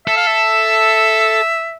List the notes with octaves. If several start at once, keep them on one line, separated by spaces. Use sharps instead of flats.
A4 E5
F5
E5